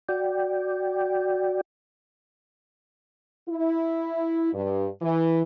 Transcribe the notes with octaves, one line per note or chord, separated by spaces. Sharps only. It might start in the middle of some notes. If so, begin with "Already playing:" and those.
F#4 D5 G5
E4
G2
E3